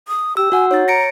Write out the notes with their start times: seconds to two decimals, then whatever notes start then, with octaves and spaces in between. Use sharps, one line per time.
0.08 D#6
0.37 G4 E6
0.52 F#4 F#5 G#5
0.71 D#4 C#5 A6
0.88 A#5 A#6 C#7 D7